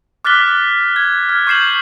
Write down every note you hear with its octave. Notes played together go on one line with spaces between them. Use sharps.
D6 F6 F#6 A6 B6 G7
G#6
F6
C#6 G6 C7 E7 F#7